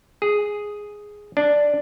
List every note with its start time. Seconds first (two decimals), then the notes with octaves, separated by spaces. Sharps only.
0.22 G#4
1.37 D4